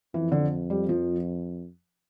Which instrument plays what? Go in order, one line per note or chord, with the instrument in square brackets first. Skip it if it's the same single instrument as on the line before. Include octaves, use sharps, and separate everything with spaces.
[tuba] F2 [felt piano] E3
[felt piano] D3
G3
F3